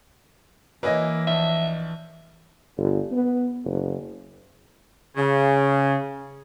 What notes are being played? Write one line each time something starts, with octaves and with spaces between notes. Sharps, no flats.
E3 A#3 E4 B4 C#5 D#5 G#5
A#1 E5
G1
B3
F#1
C#3